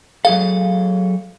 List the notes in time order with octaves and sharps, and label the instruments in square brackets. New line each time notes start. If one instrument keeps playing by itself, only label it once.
[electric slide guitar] F#3 G#4 A4 [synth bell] F5